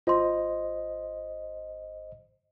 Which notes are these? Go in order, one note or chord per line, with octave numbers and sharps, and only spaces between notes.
G#1 F4 C5 D#5 C6